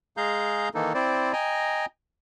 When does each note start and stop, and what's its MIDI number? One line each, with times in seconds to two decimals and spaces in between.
0.17 0.69 56
0.17 0.69 68
0.17 0.69 77
0.17 0.69 82
0.17 0.69 91
0.74 0.93 51
0.74 0.93 52
0.74 0.93 58
0.74 0.93 63
0.74 0.93 69
0.94 1.33 60
0.94 1.33 64
0.94 1.33 72
0.94 1.33 74
1.33 1.86 75
1.33 1.86 79
1.33 1.86 80
1.33 1.86 82